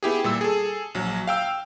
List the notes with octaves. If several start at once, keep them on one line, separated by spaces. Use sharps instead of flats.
B3 E4 G4 G#4
A#2 G3 E6
G#4 A4
A#1 F#3
F5 G5 E6